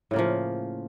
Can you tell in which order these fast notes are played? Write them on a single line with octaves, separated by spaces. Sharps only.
A2 C#3 A#3 F3